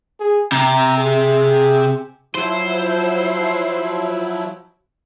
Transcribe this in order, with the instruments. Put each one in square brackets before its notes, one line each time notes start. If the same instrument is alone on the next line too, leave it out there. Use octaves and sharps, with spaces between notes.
[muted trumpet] G#4
[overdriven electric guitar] C3 [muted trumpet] A#5
[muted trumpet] G#4
[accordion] F3 F#3 E4 [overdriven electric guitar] C5